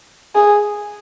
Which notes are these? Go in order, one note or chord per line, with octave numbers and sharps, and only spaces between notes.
G#4